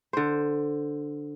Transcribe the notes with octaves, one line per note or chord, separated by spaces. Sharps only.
D3 C5